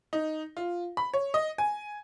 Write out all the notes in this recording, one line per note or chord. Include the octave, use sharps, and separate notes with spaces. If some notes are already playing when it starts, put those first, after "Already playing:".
D#4
F4
B5
C#5
D#5
G#5